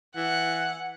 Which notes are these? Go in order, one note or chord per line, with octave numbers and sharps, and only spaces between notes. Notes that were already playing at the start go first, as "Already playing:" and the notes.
E3 F#5